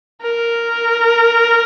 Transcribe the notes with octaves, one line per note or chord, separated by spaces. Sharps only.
A#4